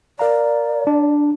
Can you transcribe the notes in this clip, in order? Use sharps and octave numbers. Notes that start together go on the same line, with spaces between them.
A#4 D5 F5 A#5
D4